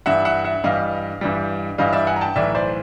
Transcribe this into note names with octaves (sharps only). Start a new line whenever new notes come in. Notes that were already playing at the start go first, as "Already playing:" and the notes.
G2 E3 G3 E5 F#5
E5 F#5
E5 F#5
G2 E3 G3 D#5 F5
G2 E3 G3
G2 E3 G3 D#5 F5
D5 E5
F#5 G#5
A#5
G5 A5
B1 A2 E3 D5 E5
C5 D5